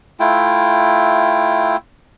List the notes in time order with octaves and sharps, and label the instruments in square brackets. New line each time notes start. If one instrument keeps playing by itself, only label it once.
[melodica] A3 E4 F4 G5